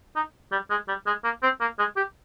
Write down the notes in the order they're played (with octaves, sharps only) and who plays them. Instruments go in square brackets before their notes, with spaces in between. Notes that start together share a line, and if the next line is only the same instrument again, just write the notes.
[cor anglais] D#4
G3
G#3
G3
G#3
A#3
C4
A#3
G#3
G4